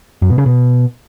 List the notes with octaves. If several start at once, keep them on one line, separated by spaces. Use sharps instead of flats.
F#2
B2
C#3
B2